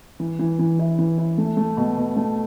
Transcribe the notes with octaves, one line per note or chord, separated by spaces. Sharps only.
E3
E3
E3
E4
E3
E4
A3
A3
B2
B2
A3